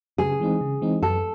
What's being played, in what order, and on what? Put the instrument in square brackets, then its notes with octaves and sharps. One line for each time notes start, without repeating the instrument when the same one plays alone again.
[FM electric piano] C#3 [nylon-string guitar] G#4
[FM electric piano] E3 G#3 C4 D#4
C#3
E3 G#3 C4 D#4
[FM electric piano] F#2 [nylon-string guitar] A4